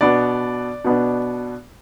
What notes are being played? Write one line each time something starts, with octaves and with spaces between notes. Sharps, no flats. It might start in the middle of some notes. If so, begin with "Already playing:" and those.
B2 B3 D4 D5
B2 B3 D4